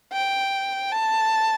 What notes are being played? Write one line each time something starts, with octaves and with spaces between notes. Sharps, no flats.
G5
A5